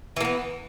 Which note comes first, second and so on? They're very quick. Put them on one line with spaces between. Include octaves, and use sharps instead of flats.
E3 A#3 B3